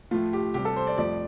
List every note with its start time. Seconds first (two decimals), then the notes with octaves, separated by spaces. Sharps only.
0.11 A2 F3 A3 F4
0.33 G4
0.54 C3 G3 G4
0.65 A4
0.76 C5
0.87 D5
0.98 F2 F3 A3 D5